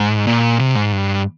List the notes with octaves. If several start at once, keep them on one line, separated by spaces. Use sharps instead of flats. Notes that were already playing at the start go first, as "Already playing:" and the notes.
Already playing: G#2
A#2
C3
G#2
G2